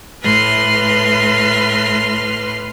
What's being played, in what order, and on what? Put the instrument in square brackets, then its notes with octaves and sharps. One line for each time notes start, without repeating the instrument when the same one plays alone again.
[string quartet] A2 B4 C6 F6